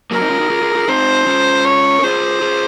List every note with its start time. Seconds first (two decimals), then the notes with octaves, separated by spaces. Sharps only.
0.11 F#3 A#3 A#4
0.21 C4 D#4
0.30 C#4 F4
0.40 D#4 F#4
0.50 F4 G#4
0.62 F4 G#4
0.75 F4 G#4
0.88 C4 D#4 C5
1.27 C#4 F4
1.65 C#5
1.99 A#4
2.03 F4 G#4 C5
2.42 F4 G#4